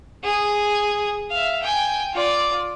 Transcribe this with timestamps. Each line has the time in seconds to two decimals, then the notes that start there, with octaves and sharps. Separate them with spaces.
0.24 G#4
1.30 E5 F5
1.62 G5 G#5
2.14 F4 D5